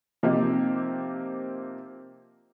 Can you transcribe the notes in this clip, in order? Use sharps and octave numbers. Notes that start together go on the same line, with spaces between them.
C3 F3 A#3 C4 D#4 G4